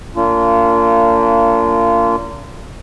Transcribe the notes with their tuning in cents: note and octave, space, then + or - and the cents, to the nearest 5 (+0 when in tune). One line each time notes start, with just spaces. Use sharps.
A#3 -30 D4 -45 F4 -25